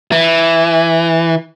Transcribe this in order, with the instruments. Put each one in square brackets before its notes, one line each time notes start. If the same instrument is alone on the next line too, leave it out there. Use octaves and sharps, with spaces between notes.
[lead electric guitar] E3